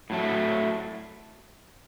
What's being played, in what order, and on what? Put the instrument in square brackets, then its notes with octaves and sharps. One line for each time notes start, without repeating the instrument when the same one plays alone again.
[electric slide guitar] A2 F#3 A3